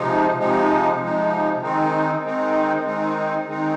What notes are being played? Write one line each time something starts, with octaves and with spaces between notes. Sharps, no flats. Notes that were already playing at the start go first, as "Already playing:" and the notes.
Already playing: C3 F3 G#3 D#4
C3 F3 G#3 D#4
C3 F3 G#3 D#4
D#3 G#3 C4 D#4
D#3 G#3 C4 D#4
D#3 G#3 C4 D#4
D#3 G#3 C4 D#4